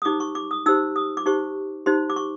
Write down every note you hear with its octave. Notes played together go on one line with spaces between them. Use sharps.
D#6
D#4 G4 C5 D6
C#6
D6
D#6
D#4 G4 C5 E6
D#6
D6
D#4 G4 C5 C#6
D#4 G4 C5 C6
D6
C#6